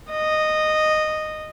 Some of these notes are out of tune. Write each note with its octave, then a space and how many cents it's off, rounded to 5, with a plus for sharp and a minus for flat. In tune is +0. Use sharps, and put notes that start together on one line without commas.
D#5 -10